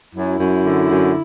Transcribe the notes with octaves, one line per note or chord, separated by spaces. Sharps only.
F#2 E4
F#2
D3
F#2